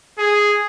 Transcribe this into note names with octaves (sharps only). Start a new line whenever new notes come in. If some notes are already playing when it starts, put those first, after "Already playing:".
G#4